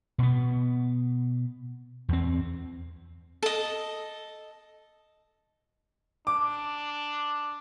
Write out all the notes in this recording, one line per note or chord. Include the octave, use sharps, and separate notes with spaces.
B2 B3
E2 C4
A4 D#5
D4 D6